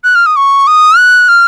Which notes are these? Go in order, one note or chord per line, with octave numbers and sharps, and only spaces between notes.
F#6
F6
D#6
C#6
D#6
F#6
F6